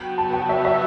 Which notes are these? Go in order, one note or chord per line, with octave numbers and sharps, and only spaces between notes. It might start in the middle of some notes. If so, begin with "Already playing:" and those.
Already playing: F#3 B3 F#4 G5
A5
G5
E5
E5